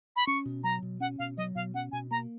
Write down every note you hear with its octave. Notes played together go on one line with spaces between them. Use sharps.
B5
C#4 C#6
B2
F#3 A#5
B2
C#4 F#5
B2 F5
F#3 D#5
B2 F5
C#4 F#5
B2 G#5
A#3 A#5